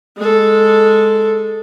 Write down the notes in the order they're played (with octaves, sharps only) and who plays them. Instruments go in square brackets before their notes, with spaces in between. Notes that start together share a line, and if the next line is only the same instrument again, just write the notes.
[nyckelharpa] G#3 A4